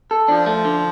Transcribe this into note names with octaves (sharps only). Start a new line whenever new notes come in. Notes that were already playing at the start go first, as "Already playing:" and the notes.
A4
F3 D4
A3
D3